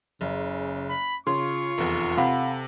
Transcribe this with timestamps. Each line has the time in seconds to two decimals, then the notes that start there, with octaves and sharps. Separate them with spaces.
0.21 F#1 C#3
0.90 B5
1.27 C#3 F4 C6 C#6
1.78 F1 E2
2.17 C3 A4 F5 F#5 B5